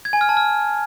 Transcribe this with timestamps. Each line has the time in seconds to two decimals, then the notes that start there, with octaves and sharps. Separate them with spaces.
0.05 G#6
0.13 G#5
0.21 F6
0.29 A5
0.37 F6